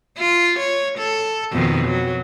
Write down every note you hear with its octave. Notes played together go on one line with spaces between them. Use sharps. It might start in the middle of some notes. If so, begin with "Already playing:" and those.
F4
C#5
A4
F2 B2 D#3
F#3